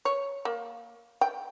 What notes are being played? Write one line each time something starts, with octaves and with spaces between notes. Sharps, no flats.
C#5
A#3
G5